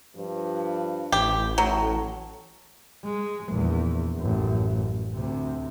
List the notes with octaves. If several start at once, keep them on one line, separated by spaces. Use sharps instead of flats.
G2 F3
A1 G4
A2 F#3
G#3
A#1 E2
A1 F#2
D2 C3